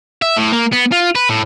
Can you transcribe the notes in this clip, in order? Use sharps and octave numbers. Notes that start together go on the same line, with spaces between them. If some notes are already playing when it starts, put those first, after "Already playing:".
E5
A2
A#3
B3
F4
B4
A2